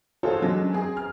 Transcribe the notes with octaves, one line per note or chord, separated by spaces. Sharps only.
F4 F#4 G#4 A4 C5 C#5
F#3 G#3 C#4 D4
C4 G#4
F6